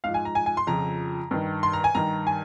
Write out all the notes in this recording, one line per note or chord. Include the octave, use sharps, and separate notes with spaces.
G#2 F3 F5
G#5
A#5
G#5
G#5
C6
F2 C#3 F3 A#5
G2 D#3
C6
A#5
G#5
G2 D#3 A#5
G#5